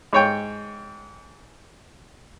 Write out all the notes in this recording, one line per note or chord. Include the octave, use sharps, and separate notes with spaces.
G#2 C#5 G5